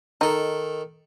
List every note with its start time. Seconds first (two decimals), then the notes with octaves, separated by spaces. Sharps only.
0.21 D#3 D#4 A4